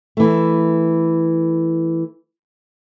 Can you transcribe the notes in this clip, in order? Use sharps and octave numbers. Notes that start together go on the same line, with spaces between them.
E3 A3